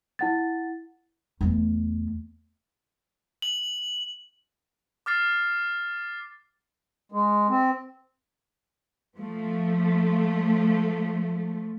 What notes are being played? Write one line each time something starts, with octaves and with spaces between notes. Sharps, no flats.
E4 F#5 A6
E2 A3
F#7
D6 F6 A6 C7
G#3
C4
F3 A3